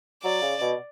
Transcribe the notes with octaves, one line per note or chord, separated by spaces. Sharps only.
F#3 D5
C#3
B2